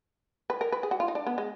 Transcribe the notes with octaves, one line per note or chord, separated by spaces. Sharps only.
B4
A#4
B4
G#4
F#4
F4
D#4
D4
B3
G#3